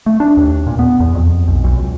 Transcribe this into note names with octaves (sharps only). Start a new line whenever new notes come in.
A3
D4
D#2
A#2
B3
E2
F2
B1
B1
C#2